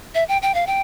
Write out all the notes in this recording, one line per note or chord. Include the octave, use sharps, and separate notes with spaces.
E5
G5
G5
F5
G5